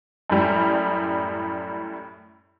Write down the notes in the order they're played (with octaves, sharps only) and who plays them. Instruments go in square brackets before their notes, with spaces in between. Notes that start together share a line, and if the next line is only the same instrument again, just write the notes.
[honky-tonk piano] F#2 A2 G3